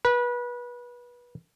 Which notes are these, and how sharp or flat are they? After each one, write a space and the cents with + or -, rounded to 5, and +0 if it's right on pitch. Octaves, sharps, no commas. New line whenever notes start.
B4 -25